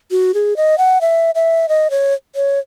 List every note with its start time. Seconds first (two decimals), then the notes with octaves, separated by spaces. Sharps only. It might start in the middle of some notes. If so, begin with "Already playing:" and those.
0.11 F#4
0.34 G#4
0.57 D#5
0.78 F#5
1.01 E5
1.35 E5
1.69 D#5
1.90 C#5
2.35 C#5